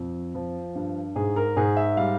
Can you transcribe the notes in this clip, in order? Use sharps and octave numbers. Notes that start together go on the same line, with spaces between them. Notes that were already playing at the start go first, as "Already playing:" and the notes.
Already playing: F2
F3
G2
G#2 G#4
A#4
G#2 G#4
E5
G3 F5